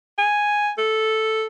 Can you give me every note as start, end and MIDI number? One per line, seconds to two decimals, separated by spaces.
0.18 0.71 80
0.78 1.47 69